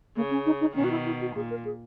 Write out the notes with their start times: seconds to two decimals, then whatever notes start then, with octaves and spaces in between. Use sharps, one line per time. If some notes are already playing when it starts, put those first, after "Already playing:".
0.16 C#3 A#3
0.31 C#4
0.46 D#4
0.61 D#4
0.76 B2 D#3 C#4
0.84 F#4
0.91 E4
1.06 E4
1.21 F#4
1.36 A#2 G#4
1.50 A#4
1.65 G#4